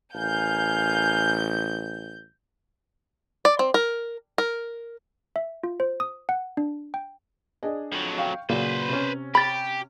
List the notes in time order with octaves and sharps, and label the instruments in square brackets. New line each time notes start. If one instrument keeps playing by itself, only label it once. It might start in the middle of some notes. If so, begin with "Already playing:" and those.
[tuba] A1 [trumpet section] A#4 F5 G#5 [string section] G6
[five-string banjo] D5
C4
A#4
A#4
[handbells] E5
F4
C5
D#6
F#5
D4
G5
[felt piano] D4 G#4 D#5
[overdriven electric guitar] F2 F#3
[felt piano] F5 G5 C#6
[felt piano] A#2 C#3 F#3 [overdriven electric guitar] B4 C5
[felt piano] C3 C#4
[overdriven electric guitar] G4 [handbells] B5 A6